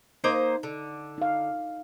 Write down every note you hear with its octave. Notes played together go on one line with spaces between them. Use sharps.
A#3 D#4 C5 D#5
D3
D#4 F5